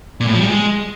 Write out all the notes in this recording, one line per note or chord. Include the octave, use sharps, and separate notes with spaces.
A#2
A2
F3
G3
G#3